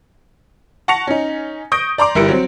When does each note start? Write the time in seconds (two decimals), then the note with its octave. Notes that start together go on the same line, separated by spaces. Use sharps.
0.88 F#5 A5 C#6 A#6 C#7 F7
1.07 C#4 D#4
1.72 C#6 D#6 G6 A#6 D7
1.98 D5 A#5 C6 D6
2.15 G1 E4 G4 A#4 C#7 D7
2.28 F#3 C4